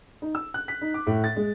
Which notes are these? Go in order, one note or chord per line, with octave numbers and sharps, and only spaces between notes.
D#4
E6
F#6
B6
D#4
D6
A2
A6
G#3